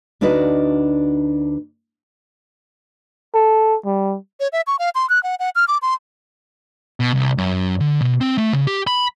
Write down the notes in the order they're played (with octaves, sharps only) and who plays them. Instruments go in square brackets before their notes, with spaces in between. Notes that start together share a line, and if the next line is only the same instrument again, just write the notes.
[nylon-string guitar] D2 D4 D#4 F#4 B4 D#5
[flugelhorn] A4
G3
[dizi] C#5
E5
C#6
F5
C6
F#6
F#5
F#5
F6
D6
C6
[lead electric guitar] B2
C2
F#2
D3
B2
C4
A3
C#3
G4
B5